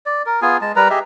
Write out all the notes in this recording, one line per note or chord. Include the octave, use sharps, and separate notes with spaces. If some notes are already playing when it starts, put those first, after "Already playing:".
D5
A#4
B3 F4 G#4 G#5
G#3 A5
G3 A#4 B4 A#5
G4 G#4 D#5 E5